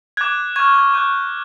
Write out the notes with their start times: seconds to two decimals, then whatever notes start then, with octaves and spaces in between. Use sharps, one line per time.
0.17 D6 F#6 G#6
0.56 C#6 F6 G#6
0.75 G#6
0.94 C#6 F#6 G6